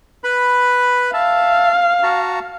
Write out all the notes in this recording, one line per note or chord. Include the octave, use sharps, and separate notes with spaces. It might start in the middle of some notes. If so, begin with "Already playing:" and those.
B4 B5
E5 F5 A5
F#4 A5 A#5